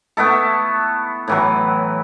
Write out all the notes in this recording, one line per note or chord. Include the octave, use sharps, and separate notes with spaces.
A3 B3 E4 A4
A2 E3 F#3